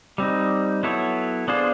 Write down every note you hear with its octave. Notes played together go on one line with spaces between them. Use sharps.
G3 C4 D#4
F#3 B3 E4 A4 C#5
B3 D4 F4 G#4 C5